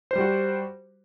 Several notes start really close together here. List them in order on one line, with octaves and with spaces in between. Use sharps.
C5 G3 F#4